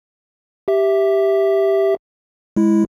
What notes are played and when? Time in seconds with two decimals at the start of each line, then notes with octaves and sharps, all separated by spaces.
0.68 G4 E5
2.56 G#3 E4